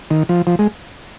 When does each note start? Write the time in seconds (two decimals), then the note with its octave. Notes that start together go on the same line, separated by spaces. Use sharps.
0.11 D#3
0.29 F3
0.47 F3
0.59 G#3